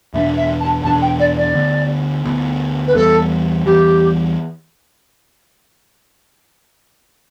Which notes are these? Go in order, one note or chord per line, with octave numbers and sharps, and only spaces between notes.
E2 B2 B3 D4 E5
E5
A5
E2 B2 B3 D4 A5
G5
D5
D5
D2 D3 B3
D2 D3 B3
B4
E2 E3 G3 B3 A4
E2 E3 G3 B3 G4